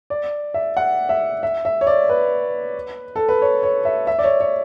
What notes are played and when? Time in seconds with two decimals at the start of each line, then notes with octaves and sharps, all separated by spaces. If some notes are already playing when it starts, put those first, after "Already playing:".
0.10 D5
0.54 E5
0.77 F#5
1.09 E5
1.43 E5
1.65 E5
1.81 C#5
1.87 D5
2.09 B4
3.16 A4
3.29 B4
3.42 C#5
3.63 C#5
3.85 E5
4.07 E5
4.19 D5
4.24 C#5
4.41 C#5